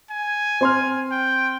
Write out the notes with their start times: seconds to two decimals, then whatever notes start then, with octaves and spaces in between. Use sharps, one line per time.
0.10 G#5
0.61 C4 C6 F6
1.11 G5